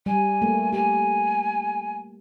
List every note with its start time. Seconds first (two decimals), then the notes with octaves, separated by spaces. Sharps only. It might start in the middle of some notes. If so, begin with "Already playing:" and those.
0.06 G3 G#5
0.42 A3 A#3
0.73 G4 G#5